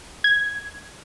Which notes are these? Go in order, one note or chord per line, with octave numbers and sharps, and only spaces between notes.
G#6